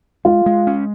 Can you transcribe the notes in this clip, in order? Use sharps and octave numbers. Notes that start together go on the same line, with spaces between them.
G#3 F4
G#3
C#4